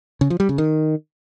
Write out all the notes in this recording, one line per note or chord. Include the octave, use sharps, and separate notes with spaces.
C#3
F3
G3
C#3
D#3